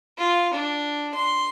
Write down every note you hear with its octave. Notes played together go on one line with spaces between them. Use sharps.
F4
D4
C6